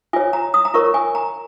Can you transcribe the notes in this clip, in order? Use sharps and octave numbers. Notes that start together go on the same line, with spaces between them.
F4 C#5 G#5
A#5
D#6
A#5
F4 A#4 C#5 C#6
G#5
A#5